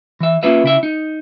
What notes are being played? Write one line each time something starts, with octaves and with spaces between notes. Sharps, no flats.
E3 E5
A#3 C#4 F4 B4 E5
C#3 E4 E5
D#4